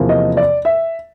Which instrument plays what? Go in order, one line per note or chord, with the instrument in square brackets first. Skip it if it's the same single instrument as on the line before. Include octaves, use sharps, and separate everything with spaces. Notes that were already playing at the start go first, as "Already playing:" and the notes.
Already playing: [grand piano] E2 C3 F3 A#3
D#5
D5
E5